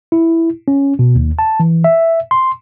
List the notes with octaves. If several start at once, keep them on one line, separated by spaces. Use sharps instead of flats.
E4
C#4
B2
D#2
A5
E3
E5
C6